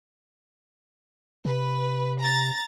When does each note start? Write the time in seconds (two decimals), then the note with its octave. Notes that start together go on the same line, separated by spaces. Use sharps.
1.45 C3 B4
2.20 A#5 A6